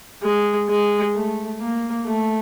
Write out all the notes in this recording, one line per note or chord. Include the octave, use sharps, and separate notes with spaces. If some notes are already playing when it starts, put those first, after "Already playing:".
G#3
G#3
A3
A#3
A3